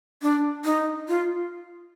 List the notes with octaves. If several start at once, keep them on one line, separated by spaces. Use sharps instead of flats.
D4
D#4
F4